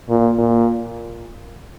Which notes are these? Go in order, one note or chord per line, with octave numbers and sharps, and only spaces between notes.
A#2
A#2